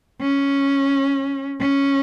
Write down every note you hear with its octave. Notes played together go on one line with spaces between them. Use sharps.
C#4
C#4